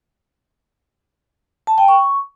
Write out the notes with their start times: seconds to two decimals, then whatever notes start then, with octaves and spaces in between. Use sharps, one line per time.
1.67 A5
1.78 G5
1.88 C#6